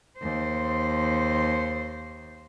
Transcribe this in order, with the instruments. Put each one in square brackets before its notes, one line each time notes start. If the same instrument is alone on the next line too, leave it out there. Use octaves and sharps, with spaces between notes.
[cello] D#2 C5